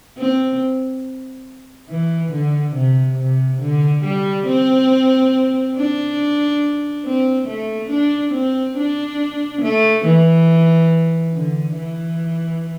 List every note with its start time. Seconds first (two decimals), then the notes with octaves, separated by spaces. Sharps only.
0.18 C4
1.90 E3
2.32 D3
2.76 C3
3.18 C3
3.61 D3
4.04 G3
4.47 C4
5.76 D4
7.05 C4
7.48 A3
7.90 D4
8.34 C4
8.77 D4
9.62 A3
10.05 E3
11.34 D3
11.78 E3